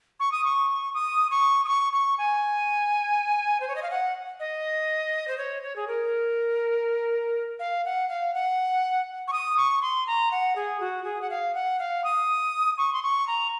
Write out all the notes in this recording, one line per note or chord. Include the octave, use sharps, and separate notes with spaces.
C#6
D#6
C#6
D#6
C#6
D#6
C#6
C#6
G#5
C5
C#5
D#5
F5
F#5
D#5
C5
C#5
C#5
G#4
A#4
F5
F#5
F5
F#5
C#6
D#6
C#6
C6
A#5
F#5
G#4
F#4
G#4
F#5
F5
F#5
F5
D#6
C#6
C6
C#6
A#5